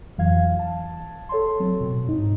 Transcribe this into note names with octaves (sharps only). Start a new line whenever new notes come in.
F2 E3 F#3 F5 G#6
A5
A4 C#5 A5 C6
F#3 C4
B2
G#2 D#4